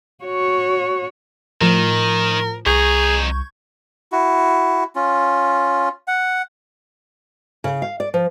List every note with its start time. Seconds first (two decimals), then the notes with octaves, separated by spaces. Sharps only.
0.24 F#4 C#5
1.61 A2 D#3 F3 A#4
2.66 C2 F2 G#4 A#5 C#6 G6 G#6
4.12 E4 F#4
4.96 C#4 F4
6.08 F#5
7.64 C#3
7.82 F5
8.00 D5
8.14 F3